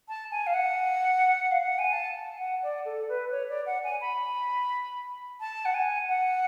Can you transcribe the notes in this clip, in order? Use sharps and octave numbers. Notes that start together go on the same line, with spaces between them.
A5
G#5
F5
F#5
F5
F#5
G#5
A5
F#5
D5
A4
B4
C#5
D5
F#5
G#5
B5
A5
F#5
G#5
F#5